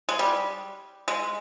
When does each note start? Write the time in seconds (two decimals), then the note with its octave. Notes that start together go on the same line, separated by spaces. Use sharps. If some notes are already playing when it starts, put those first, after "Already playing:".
0.09 G#3
0.19 G3
1.08 G#3